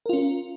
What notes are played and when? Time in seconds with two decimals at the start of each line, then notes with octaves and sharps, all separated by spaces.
0.06 A#4
0.09 F4
0.13 C#4